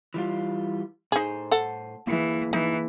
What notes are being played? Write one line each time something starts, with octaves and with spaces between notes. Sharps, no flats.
E3 G3 F4
A2 D#4 G#4 C5
A4 F#5
E3 A#3 E4 G#4
E3 D#4